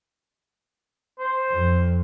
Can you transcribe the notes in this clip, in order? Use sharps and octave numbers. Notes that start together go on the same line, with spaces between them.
C5
F2